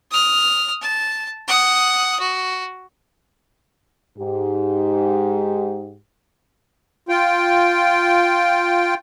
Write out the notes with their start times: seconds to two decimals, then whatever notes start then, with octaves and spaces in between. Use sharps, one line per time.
0.11 D#6 F6
0.82 A5
1.48 F#5 D#6
2.20 F#4
4.17 G#2 G4
7.09 F4 G5